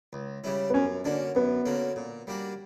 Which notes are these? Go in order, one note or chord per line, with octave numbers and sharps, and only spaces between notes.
C#2
C#3 G3 C#4 E4
B3
F#2 C#4
D3 A#3 C#4 D4 F#4
F#2 B3
D3 A#3 C#4 F#4
A#2
G3 A#3 D4 F#4